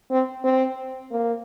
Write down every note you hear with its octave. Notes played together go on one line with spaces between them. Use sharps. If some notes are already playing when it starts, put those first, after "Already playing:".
C4
C4
A#3